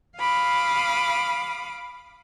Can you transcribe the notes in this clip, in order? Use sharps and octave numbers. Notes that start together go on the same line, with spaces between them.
F5 B5 D6 D#6